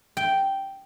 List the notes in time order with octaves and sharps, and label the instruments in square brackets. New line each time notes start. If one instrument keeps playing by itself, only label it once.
[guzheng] G5